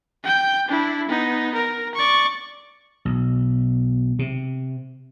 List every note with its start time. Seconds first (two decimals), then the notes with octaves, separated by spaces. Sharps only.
0.24 G5 G6
0.68 D4 E4
1.08 B3 D#4
1.54 A#4
1.94 D5 C#6
3.05 B1
4.19 C3